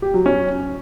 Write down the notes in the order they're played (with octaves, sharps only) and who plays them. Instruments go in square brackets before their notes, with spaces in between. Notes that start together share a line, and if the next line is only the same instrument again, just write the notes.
[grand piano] G4
F#3
C#4